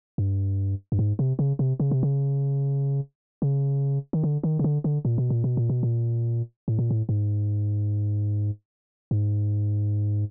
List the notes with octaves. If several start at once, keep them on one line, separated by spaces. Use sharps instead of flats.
G2
G2
G#2
C3
C#3
C3
C#3
C3
C#3
C#3
D#3
D3
D#3
C#3
D3
D3
A#2
B2
A#2
B2
A#2
B2
A#2
A2
A#2
A2
G#2
G#2